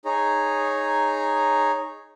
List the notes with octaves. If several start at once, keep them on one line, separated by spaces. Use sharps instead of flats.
D#4 G#4 C#5 A#5